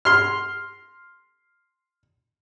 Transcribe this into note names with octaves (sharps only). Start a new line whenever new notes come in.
C6 F6